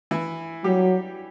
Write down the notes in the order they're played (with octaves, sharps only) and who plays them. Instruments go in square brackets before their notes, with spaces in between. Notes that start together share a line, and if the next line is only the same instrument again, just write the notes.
[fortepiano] E3 E4
[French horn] F#3 [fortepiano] G3 G4